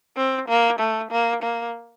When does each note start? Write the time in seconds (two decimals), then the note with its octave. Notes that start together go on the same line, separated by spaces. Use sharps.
0.17 C4
0.48 A#3
0.79 A3
1.11 A#3
1.43 A#3